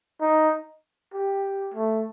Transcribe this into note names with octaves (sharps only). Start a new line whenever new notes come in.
D#4
G4
A3